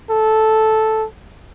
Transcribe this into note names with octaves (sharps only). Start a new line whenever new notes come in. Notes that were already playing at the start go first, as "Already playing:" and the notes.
A4